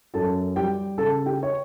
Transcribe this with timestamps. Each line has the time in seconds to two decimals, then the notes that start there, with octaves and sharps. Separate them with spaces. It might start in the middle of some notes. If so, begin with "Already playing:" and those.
0.14 F#2 A4 A5
0.56 G3 G4 G5
0.98 C#3 A4 A5
1.26 G4 G5
1.43 C#5